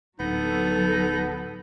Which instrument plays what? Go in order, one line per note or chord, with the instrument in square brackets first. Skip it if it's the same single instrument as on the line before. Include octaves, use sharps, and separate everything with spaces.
[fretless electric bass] D1 [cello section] F#3 A4 [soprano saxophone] B3 [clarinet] D#4